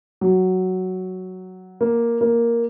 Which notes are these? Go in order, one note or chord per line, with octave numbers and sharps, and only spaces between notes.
F#3
A#3
A#3